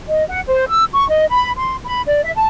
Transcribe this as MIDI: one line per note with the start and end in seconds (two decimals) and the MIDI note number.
0.08 0.23 75
0.27 0.39 78
0.47 0.68 72
0.68 0.84 88
0.92 1.06 85
1.08 1.25 75
1.28 1.50 83
1.56 1.75 84
1.83 2.01 83
2.06 2.20 74
2.22 2.31 76
2.35 2.46 81